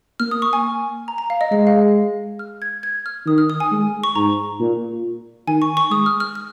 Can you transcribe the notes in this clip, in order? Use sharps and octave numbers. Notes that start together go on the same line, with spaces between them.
A#3 F6
D#6
C#6
G#5
A#5
A#5
F5
D#5
G#3 D#5
F5
F6
G#6
G#6
F6
D#3 D#6
F6
D#6
G#5
G#3
C#6
G#2 A#5
A#2
D#3 G#5
C#6
C#6
G#3 D#6
F6
F6
F6